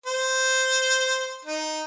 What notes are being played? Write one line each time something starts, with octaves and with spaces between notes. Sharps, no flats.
C5
D#4